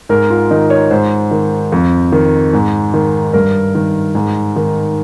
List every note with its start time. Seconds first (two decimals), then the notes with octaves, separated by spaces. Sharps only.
0.09 G#2 A#4
0.30 F4
0.51 D#3 D#4
0.70 C#5
0.91 G#2 C5
1.31 D#3
1.72 F2
2.12 D#3
2.53 G#2
2.94 D#3
3.33 G2 A#4
3.75 D#3
4.15 G#2
4.56 D#3